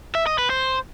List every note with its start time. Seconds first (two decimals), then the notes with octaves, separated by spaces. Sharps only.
0.15 E5
0.27 D#5
0.38 B4
0.50 C5